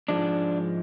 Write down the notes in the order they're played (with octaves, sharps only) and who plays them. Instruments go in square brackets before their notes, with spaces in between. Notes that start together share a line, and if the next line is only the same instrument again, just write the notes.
[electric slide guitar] G#2 F3 G#3 D4